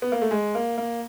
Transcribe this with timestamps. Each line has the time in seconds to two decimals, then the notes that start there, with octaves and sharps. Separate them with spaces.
0.02 B3
0.12 A#3
0.22 A3
0.31 G#3
0.55 A#3
0.78 A#3